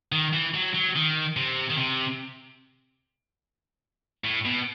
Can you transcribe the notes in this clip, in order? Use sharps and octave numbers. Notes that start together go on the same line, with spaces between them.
D#3
E3
F#3
F#3
D#3
C3
D#3
C3
A2
B2